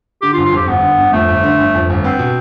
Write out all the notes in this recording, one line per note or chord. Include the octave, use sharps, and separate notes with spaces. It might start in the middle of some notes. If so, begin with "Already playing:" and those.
D3 G4
F4
G1
F4
F2 G4
G1 B3
D3
G1
F2 A3
G1
D3
G1
F2
G1
B3 C4
B2